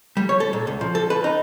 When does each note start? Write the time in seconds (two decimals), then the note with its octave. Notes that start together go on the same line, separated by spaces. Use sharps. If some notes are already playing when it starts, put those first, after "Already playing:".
0.17 G3
0.29 C#5
0.40 A4
0.53 A#2
0.67 C#2
0.81 F3
0.95 A4
1.10 B4
1.24 D#4